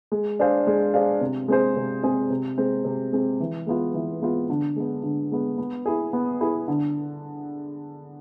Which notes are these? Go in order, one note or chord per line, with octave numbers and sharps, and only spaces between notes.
G#3
D4 G#4 C5 F5
G#3
D4 G#4 C5 F5
C3
G#3 C4 G#4 C5
C3
G#3 C4 G#4 C5
C3
G#3 C4
C3
G#3 C4
E3
G#3 B3 F4
E3
G#3 B3 F4
D3
G#3 B3
D3
G#3 B3
B3
E4 G#4
B3
E4 G#4
D3